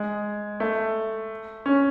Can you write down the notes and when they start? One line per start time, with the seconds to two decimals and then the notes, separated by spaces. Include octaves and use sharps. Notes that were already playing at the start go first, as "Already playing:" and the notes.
Already playing: G#3
0.60 A3
1.66 C#4